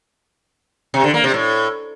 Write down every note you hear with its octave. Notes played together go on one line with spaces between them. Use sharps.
C3
D3
A#3
C3
A2